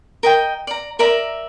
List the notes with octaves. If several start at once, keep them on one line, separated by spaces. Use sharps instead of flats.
A#4 D#5 G5
D5 A#5
A#4 D5 E5 A#5